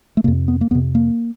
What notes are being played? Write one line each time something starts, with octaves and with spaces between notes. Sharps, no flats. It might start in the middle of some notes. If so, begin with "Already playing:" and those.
A3
F2 C3 A#3
B3
A#3
F2 C3 B3
A#3